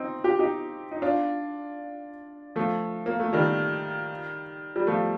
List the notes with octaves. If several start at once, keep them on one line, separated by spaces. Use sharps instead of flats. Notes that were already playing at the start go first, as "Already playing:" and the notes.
Already playing: C4 D#4
G4
D#4 G4
D#4
D4 F4
F3 A3
A#3
A3
D#3 G3
G3
F3 A3